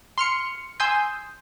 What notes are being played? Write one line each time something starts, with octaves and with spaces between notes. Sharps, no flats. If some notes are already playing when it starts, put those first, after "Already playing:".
C6 F6 C#7
G#5 C6 D#6 E6 G6